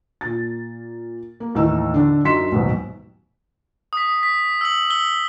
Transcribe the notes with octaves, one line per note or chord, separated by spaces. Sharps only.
A#2 A6
A#3
D#2 A2 E3 D#4 E6
D3 D4
F#2 D4 D#4 C6 B6 E7
A1 D#2 G#2 B2 F#3
D#6 B6
B6
E6 F#7
E6 G7